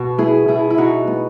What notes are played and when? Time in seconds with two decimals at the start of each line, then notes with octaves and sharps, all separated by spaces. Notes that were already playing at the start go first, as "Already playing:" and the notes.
Already playing: B2 F#4
0.18 B3 E4 G#4
0.48 B2 E4 G#4
0.70 E4
0.77 B2 D#4 F#4
1.07 B3